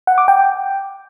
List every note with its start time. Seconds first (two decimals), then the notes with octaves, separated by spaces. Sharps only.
0.07 F#5
0.18 D6
0.28 G5